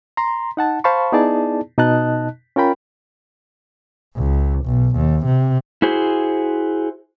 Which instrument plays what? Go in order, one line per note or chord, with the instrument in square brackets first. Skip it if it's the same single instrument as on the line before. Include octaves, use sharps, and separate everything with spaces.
[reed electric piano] A#5 C6
D#4 F#5 A5
C5 F5 A5 B5 C#6
B3 D#4 E4 G#4 D5 A5
B2 D#4 D#5 A5 F#6
C#4 F4 A#4 G5 B5
[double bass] C#2
B1
D#2
C3
[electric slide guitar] E4 F#4 G#4 C5